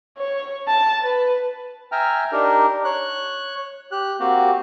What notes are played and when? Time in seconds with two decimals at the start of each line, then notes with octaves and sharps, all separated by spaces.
0.17 C#5
0.68 A5
1.03 B4
1.92 E5 G5 G#5 A#5 F6
2.32 D4 D#4 G4 A#4
2.85 C#5 F#6
3.92 G4 F#6
4.20 A#3 C4 F#4 G4